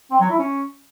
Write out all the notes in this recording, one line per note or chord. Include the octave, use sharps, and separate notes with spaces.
C4
F#3
E4
C#4